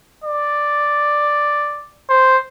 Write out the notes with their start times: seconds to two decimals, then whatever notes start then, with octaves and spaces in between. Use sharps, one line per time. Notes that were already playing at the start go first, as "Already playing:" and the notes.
0.24 D5
2.10 C5